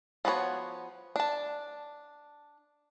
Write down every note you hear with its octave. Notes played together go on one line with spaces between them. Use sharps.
F3 B3 F#4 G#4 C#5
D4 A5